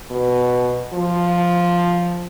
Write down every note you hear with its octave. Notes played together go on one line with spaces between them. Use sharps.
B2
F3